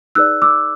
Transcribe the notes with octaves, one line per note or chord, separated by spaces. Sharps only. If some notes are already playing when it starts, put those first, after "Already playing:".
D#4 G#4 B4 D5 E6 F#6
D6 E6